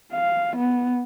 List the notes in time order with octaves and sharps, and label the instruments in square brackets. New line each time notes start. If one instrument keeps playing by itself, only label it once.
[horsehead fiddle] F5
B3